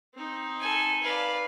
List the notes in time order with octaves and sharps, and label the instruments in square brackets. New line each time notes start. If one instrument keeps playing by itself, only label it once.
[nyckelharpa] C4 D#4
[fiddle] A4 G#5
[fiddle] B4 D5 [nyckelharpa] F5